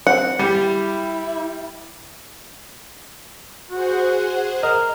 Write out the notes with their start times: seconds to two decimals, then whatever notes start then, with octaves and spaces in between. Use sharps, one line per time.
0.07 C4 F#5
0.39 G3 E4 G4
3.70 F#4 G#4 C5 F#5
4.63 A#4 D#5 F6